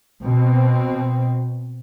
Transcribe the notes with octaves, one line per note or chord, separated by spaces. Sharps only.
B2 C4